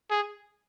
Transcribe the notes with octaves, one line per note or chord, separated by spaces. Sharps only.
G#4